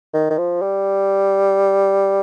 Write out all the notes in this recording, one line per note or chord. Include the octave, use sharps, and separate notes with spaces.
D#3
D#3
F3
G3